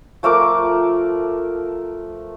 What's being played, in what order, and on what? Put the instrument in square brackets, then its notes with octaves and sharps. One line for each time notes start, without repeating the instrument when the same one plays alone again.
[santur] F3 A3 A#4 D6